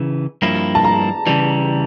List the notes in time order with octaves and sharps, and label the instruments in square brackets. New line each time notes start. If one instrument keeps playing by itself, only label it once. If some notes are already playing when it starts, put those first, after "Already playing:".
Already playing: [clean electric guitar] C#3 E3
G2 F3 A#3 E4
[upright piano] A5
A#5
[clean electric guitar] C#3 E3 G3